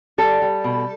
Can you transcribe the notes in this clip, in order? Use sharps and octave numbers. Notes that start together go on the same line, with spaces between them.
G3 A4
G3
B2